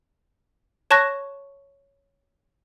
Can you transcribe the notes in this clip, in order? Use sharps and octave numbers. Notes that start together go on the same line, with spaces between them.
C#5 A5 C#6 F#6 A#6